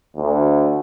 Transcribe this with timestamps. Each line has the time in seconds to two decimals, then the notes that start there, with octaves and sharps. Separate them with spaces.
0.17 D2